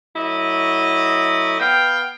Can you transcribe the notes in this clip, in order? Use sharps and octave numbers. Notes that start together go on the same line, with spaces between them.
F#3 A3 E4 D#5
B3 F5 G5